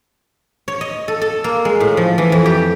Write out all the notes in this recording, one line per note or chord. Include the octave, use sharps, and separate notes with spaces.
C#5
D#5
A4
A4
A#3
G#3
A2
F3
E3
F2
G4